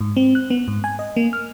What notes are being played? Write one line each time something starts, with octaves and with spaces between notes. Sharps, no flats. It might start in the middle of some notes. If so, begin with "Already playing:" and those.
G#2
C4
F#6
B3
G#2
G#5
D#5
A#3
F6